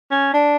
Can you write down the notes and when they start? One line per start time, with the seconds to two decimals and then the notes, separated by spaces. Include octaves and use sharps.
0.11 C#4
0.34 D4